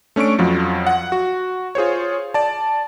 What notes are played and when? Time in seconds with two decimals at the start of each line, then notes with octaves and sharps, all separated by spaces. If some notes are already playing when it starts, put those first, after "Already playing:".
0.16 A3 C#4 D4 C#6 D7
0.39 F2 F3 F#3
0.87 F#5
1.12 F#4
1.75 F4 G#4 C5 C#5
2.34 D5 A5